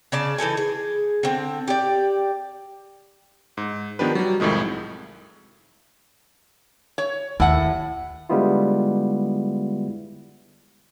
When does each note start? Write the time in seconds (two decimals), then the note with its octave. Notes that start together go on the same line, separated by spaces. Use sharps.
0.12 C#3 D5 A5
0.38 E3 D#4 A4 G#5
0.57 G#4
1.23 D3 C4
1.68 G4 D5
3.57 G#2
3.99 D#3 F3 B3 D4 G4 B4
4.15 F#3 G3
4.40 C2 F2 A2 D#3 G#3
6.98 C#5
7.40 D#2 A2 F#5
8.29 D3 G3 G#3 B3 E4 F4